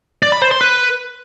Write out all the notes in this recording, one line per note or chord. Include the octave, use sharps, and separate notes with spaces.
D5
B5
C5
C6
B4